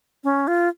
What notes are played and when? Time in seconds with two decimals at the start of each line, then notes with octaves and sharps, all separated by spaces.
0.24 C#4
0.48 F4